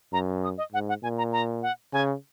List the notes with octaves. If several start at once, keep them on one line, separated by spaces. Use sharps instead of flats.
F#2 A#5
D#6
D#5
G#2 F#5
F#5
A#2 G#5
A#5
A#5
F#5
C#3 G#5